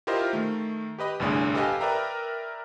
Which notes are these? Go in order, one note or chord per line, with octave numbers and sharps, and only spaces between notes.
E4 F4 G4 A#4 C5 D#5
D#3 A3
G4 B4 D#5 B5
G1 C2 A2 D4 G#4
G4 A4 B4 D#5 F5 G#5
A#4 B4 D5 E5 G5 A#5